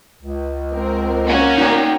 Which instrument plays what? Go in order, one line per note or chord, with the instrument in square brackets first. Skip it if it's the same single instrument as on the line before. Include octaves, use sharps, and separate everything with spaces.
[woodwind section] C#2
[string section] G#3 C4 A#4
[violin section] A#3 C#4 F#4
[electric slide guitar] D#4 D5 [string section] G5 A#5